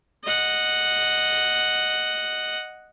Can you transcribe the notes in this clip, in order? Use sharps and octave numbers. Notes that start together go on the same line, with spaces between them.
D#5 F#5